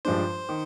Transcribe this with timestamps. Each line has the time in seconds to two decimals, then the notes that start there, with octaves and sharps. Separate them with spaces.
0.05 G2 F3 G#3 D4 C5
0.49 D#3